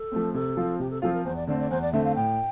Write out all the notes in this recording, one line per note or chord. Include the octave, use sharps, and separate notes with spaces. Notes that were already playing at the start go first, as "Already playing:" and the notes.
Already playing: A4
F3 A3 C4
C3 A4
F3 C4 F4
C3 G4
A4
F3 C4 F4 A4
A#4
E2 C5
D5
D3 A3 C4 D5
D5
E2 C5
D5
D3 A3 C4 E5
F5
A2 G5